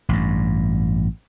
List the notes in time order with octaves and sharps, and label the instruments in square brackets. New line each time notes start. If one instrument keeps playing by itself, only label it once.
[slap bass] A1 G2